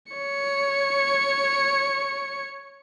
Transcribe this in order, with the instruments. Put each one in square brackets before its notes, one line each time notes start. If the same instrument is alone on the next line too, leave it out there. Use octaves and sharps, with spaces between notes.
[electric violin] C#5 C#7